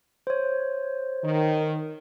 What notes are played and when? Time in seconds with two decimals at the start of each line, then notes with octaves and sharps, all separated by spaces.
0.27 C5 C#5
1.23 D#3